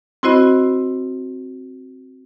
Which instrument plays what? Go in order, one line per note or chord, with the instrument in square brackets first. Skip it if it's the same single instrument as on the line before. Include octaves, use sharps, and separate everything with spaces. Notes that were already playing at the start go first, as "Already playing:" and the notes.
[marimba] C4 E4 F#4 C5 D#5 B5